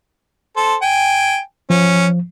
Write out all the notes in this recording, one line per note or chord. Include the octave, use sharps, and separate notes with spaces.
A4 C5
G5 G#5
F3 C#4